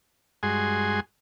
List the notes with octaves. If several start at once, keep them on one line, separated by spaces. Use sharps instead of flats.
G2 G#3 F#4 G#4 G#5 C6